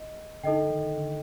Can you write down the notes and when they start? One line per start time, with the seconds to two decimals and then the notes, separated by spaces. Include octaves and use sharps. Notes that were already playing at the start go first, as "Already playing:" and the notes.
Already playing: D#5
0.43 D3 D#4 A4 D#5 G5
0.57 D3
0.70 D#3
0.97 D3